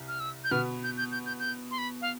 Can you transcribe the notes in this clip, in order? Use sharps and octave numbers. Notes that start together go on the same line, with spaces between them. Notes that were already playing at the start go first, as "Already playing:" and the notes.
Already playing: C2
F6
E6
G6
B2 B3 F6
G6
G6
G6
G6
G6
C6
B5
F5